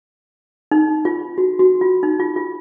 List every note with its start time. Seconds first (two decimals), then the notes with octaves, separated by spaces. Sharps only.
0.71 D#4
1.05 F4
1.38 F#4
1.59 F#4
1.81 F4
2.03 D#4
2.20 F4
2.36 F4